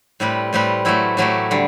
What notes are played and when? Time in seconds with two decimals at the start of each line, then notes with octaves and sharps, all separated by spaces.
0.20 A2 G3 C4 G4 B4
0.53 A2 G3 C4 G4 B4
0.85 A2 F#3 A3 E4 G4
1.17 A2 F#3 A3 E4 G4
1.51 D3 G3